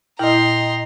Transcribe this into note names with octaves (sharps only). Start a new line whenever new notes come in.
A#2 E4 D#5 G5 A#5 C6 F6